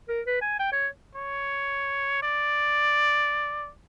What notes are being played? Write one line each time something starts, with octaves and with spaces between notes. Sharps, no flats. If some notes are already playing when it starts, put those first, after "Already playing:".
A#4
B4
G#5
G5
C#5
C#5
D5